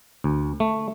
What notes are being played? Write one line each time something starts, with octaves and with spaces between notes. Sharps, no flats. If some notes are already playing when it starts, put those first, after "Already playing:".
D2
A3